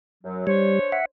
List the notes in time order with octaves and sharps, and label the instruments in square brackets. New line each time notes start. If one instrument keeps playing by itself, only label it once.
[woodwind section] F#2 F#3
[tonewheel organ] G3 [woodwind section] D4 C5 C#5
[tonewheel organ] E5 F#5